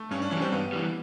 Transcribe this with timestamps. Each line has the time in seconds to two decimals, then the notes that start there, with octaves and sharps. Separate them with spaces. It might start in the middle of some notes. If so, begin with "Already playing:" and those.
Already playing: A3
0.11 G2 C#4
0.22 D4
0.31 E3 G3 C#4
0.42 C4
0.52 G2 B3
0.73 E3 G3